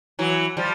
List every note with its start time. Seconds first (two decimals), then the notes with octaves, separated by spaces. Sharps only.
0.19 E3 F#3
0.57 F3 G3